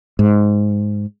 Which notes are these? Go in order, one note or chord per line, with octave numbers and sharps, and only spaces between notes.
G#2